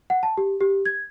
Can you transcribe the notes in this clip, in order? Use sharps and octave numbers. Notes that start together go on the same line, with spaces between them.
F#5
A5
G4
G4
G#6